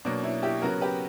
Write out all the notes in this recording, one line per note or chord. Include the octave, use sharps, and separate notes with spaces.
B2 F#3 A#3 D4
C#4 E4
E4 G4
C#3 F#3 B3 F#4 A#4
G4 B4